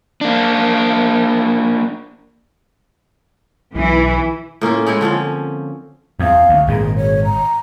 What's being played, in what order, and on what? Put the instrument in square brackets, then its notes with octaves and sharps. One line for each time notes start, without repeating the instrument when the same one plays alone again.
[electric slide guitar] A#3 D4
[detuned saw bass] B1 [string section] E3
[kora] A2 A#3 C#4 F4
G#3 C4 E4 C#5
D3 F3 C4 C#4
[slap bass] E2 [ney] F5
[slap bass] D2
[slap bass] G#1 A#2 [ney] G#4
[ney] C#5
A#5